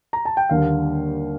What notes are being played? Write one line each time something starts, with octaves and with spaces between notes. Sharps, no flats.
A#5
A5
G5
D#2 D3 G3 F5